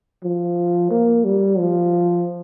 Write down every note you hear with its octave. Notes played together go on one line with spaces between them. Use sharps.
F3
A#3
G3
F3